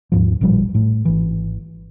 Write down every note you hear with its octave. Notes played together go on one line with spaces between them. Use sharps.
D#2 G#2 F3
A1 A#2 F3 G3
A2 A3
G#1 E3